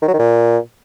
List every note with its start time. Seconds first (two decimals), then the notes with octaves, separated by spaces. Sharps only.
0.02 D#3
0.08 F#3
0.14 D#3
0.19 A#2